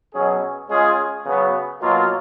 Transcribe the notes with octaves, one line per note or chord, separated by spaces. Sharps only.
B2 F#3 C#4 G#4
G#3 C#4 F4 G#4
C#3 F#3 B3
B2 F#3 A#3 F4